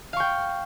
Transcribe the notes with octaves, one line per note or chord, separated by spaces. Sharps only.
F5 G5 C#6